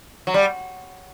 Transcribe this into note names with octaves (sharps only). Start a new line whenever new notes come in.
F#3
G3